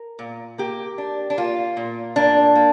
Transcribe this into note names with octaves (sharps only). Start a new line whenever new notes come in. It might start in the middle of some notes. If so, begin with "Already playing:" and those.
Already playing: A#4
A#2
A#3 G4
D4
D4
A#3 F4
A#2
A#3 D4
A#3